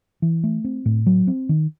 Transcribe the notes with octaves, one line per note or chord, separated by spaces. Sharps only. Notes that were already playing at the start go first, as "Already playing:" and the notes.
E3
A3
C4
A2
F#3
C4
D#3